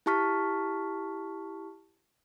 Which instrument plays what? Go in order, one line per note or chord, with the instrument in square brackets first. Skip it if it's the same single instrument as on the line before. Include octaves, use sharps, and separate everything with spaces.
[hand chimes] E4 G4 A5 C#6 F6 B6